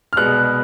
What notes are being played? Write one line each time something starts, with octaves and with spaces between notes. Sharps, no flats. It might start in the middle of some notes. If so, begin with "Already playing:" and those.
F6
C2 B2 G#3 B3 F#6